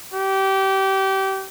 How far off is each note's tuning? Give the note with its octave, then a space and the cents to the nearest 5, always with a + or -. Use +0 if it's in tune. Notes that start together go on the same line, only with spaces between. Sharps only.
G4 -25